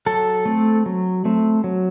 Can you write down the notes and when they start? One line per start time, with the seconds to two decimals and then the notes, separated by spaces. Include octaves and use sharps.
0.06 F#3 A4
0.45 A3 C4
0.86 F#3
1.25 A3 C4
1.64 F#3